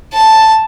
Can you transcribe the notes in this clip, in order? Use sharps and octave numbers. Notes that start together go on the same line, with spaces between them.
A5